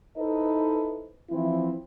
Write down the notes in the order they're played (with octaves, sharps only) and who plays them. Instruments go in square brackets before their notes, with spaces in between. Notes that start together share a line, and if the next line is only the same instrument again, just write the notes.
[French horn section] D#4 E4 A4 B4 C5 D#5
E3 F3 C4 E4